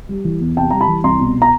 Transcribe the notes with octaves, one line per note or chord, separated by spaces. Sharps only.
G3
E3
E2
C3 G5 A5
G3 A#5
A5 B5
E3
C2 A#5 C6
B2
A#5